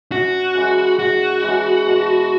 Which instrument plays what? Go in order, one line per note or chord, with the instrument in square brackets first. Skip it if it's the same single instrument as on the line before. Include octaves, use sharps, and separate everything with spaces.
[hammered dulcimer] F#2 [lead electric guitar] F#4
[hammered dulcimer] C#3 E3 G#3
[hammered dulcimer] F#2 [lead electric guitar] F#4
[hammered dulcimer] C#3 E3 G#3
B2